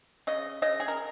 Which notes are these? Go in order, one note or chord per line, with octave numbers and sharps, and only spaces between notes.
C#3 D#5
C#3 D#5
G#4
A#4